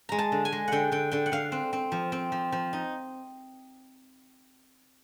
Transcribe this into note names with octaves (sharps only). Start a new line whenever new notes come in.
G#3 A#5
A5
D3
G#5
G#3
D3 F#5 G5
D3 G5
D3 G5
F#5
D3 F5
C4
C4
F3
C4
F3
F3
D#4